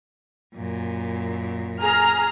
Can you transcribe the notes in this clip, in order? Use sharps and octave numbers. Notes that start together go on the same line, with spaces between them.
F#2 A#2
G#4 A#5 F6